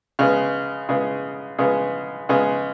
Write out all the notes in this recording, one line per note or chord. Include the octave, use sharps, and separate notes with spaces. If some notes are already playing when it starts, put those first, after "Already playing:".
C#3 G#3 B3
C#3 G#3 B3
C#3 G#3 B3
C#3 G#3 B3